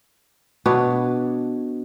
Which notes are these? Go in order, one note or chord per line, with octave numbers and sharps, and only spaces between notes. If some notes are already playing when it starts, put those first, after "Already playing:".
B2 D4 B4 C#5